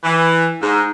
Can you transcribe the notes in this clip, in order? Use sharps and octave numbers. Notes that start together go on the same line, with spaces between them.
E3
G#2